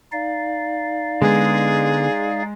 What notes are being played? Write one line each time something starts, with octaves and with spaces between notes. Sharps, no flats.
D#4 D5 F5
D3 G#3 B3 G#4